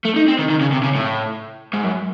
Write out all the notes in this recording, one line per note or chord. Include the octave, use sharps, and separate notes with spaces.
A3
D#4
C4
D#3
D#3
C#3
C3
C#3
A2
G#2
F#2